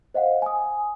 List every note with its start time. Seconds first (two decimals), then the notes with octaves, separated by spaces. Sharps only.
0.14 C5 D#5 F5 F#5
0.42 G#5 D#6